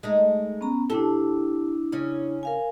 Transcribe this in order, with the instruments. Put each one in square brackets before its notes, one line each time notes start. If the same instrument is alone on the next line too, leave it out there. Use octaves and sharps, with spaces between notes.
[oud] G#3 A3 D#4
[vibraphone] B3 C#4 A#5
[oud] C3 G4 A4 [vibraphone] D4 E4
[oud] C#3 C#4
[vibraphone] A#4 F5 G#5